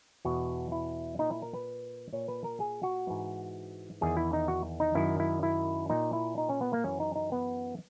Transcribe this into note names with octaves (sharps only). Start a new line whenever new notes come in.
E2 B2 F#4
E4
A#2 D#4
E4
A#4
B4
A#2 C#5
B4
A#4
G#4
F#4
G#2 E3
E2 D#3 G#4
E4
D#4
F#4
D#4
F#2 D#3 E4
E4
E4
A#2 D#4
E4
D#4
C#4
B3
A#3
F#2 E3 C#4
D#4
D#4
B3